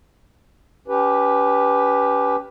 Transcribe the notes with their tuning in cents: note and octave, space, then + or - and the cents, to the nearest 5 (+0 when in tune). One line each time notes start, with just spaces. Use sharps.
C#4 +30 G4 +0 B4 +0